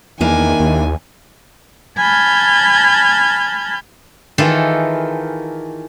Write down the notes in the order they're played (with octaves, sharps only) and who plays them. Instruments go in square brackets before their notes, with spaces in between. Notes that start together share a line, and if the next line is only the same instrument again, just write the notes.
[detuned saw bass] E2 [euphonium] D#3 [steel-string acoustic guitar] A#3 D4 E4 [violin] G#5
[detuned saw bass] D#2
[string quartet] G#5 A5 B5 F6 G6 G#6
[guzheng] D#3 E3 D#4 F4 G#4 A4